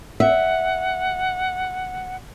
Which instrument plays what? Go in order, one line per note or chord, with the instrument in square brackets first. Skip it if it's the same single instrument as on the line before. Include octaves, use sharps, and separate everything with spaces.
[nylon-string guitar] E5 [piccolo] F#5